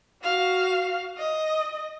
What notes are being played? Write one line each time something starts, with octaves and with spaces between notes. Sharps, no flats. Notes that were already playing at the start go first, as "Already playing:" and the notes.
F#4 F5
D#5